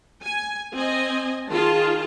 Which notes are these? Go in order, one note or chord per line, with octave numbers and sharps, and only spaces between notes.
G#5
C4 D#5 G#5
D#3 F4 G#4 A5